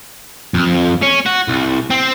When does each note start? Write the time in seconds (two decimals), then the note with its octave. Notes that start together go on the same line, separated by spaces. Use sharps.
0.54 F2
1.02 C#4
1.26 F#4
1.48 C2
1.91 C4